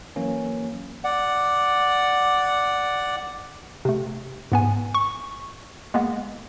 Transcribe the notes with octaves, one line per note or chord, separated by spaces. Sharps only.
E3 F#3 A#3 C#4
D5 F#5
C3 A3
G#2 B3 G#5
C#6
G#3 A#3 B3